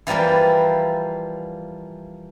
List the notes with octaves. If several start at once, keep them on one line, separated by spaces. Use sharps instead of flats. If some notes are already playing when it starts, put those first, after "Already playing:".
E3 F3 G3 A#3 B4